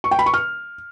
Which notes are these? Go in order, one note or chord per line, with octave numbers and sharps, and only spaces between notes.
C#6
G5
B5
C#6
F6